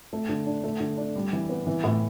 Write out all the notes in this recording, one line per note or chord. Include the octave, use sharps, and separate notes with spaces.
A3
D3
D4
A3
D3
D4
G3
E3
B3
E3
A2